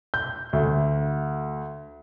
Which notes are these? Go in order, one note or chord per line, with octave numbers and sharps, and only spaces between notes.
G6
D2